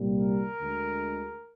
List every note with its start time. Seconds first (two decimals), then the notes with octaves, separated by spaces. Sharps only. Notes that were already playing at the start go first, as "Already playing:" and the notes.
Already playing: C2 A#2 G3 A#3
0.20 A#4
0.60 D2 D3 G#3